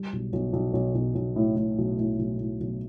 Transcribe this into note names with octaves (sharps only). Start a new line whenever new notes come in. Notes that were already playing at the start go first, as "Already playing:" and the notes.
Already playing: G3
B1
B1
B1
B1
B1
B1
A2
A2
B1
A2
B1
A2
B1